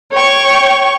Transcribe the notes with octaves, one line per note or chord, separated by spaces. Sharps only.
C#5 G5 C#6